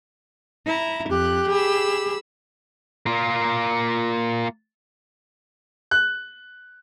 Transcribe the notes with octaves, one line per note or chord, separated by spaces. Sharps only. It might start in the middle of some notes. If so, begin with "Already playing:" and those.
E4 A#5
F2 G4 F#6
G#4 B5 E6
A#3 F4
F#6